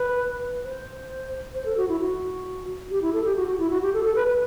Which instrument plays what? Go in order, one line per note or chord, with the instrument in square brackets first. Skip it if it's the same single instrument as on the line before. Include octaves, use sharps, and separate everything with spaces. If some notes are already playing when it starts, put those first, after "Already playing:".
Already playing: [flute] B4
C5
C5
A4
F#4
E4
F#4
G4
E4
A4
G4
F#4
F#4
E4
F#4
G4
A4
A4
B4
B4